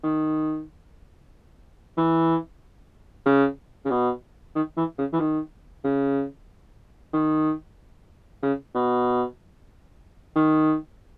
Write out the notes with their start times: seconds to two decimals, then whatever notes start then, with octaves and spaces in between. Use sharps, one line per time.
0.04 D#3
1.97 E3
3.26 C#3
3.85 C#3
3.90 B2
4.55 D#3
4.77 E3
4.98 C#3
5.13 E3
5.20 D#3
5.84 C#3
7.13 D#3
8.43 C#3
8.75 B2
10.36 D#3